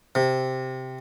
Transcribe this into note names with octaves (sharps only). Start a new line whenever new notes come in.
C3